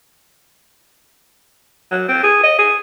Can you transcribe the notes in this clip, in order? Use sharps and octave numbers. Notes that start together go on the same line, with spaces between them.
F#3
C4
G#4
D#5
G#4